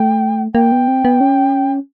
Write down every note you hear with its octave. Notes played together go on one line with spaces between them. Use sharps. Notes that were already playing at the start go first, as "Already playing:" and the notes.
Already playing: A3 G5
A#3 G5
B3
C4
B3
C#4